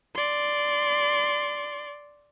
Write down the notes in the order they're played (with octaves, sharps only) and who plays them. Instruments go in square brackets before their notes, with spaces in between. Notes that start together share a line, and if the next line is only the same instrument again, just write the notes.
[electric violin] D5 C6